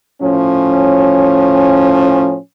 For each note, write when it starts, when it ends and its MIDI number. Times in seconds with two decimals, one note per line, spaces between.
0.22 2.37 45
0.22 2.37 53
0.22 2.37 61